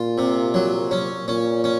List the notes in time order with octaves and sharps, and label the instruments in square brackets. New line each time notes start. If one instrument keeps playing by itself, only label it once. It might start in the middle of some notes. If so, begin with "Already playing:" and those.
Already playing: [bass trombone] A#2 [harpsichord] F4
[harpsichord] C3
F#3
C#4
[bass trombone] A#2 [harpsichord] C#4
[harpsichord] C#4